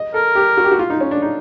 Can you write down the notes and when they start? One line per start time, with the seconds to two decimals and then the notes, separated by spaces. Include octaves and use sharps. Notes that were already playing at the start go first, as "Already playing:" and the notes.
Already playing: D#5
0.14 A4 A#4
0.35 G4
0.57 F#4
0.64 G4
0.72 F#4
0.79 F4
0.90 D#4
1.00 C#4
1.11 D4
1.22 D#4